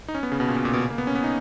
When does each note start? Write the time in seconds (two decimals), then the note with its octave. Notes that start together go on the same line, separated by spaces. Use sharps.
0.08 D#4
0.14 C#4
0.23 B3
0.32 C#3
0.40 B2
0.48 A#2
0.57 B2
0.65 A#2
0.73 B2
0.82 C#3
0.90 A#3
0.98 B3
1.07 C#4
1.15 B3
1.24 D#4